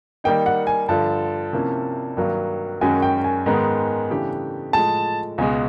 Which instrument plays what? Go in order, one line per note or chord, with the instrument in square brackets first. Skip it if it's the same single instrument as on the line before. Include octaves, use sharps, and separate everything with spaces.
[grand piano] D#3 G3 A#3 D#4 [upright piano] G5
[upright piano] F#5
G#5
[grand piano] G2 D3 F3 [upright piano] A5
[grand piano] C3 F3 A#3 C#4 E4
G2 D#3 F#3 A#3
[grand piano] F#2 D#3 G#3 C#4 F#4 [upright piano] G#5
[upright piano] G5
G#5
[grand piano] G#2 D#3 G#3 B3
C#3 E3 A3 D4 G4
[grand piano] A2 F3 G#3 [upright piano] A5
[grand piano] C#2 B2 G#3 [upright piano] G#5